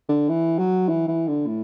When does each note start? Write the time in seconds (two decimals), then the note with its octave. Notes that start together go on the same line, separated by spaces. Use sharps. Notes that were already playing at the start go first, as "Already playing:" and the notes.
0.09 D3
0.29 E3
0.59 F#3
0.88 E3
1.08 E3
1.27 D3
1.47 A2